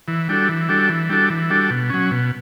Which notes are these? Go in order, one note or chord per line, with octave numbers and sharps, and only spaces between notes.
E3
G3 D4 F#4 A4
E3
G3 D4 F#4 A4
E3
G3 D4 F#4 A4
E3
G3 D4 F#4 A4
B2
F#3 C#4
B2